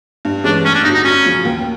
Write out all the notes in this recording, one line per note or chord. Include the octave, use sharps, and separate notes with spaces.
G2
E3 G#3 C#4 D4
A1 C#4
D4
G2 D3 F#3 D#4
D#4
F#2 C#4
C#3 F3
D#2